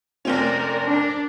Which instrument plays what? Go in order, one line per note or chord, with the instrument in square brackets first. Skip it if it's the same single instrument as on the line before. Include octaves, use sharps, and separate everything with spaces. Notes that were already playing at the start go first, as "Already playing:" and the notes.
[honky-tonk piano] F1 C4 C#4 [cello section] A#4 D5
[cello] D4